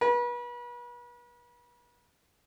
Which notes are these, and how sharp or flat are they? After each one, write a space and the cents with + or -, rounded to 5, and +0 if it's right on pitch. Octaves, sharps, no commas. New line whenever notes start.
B4 -35